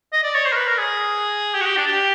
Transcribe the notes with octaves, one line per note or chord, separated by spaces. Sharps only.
D#5
D5
C#5
C5
A#4
B4
A#4
G#4
G4
F#4
G4
D4
G4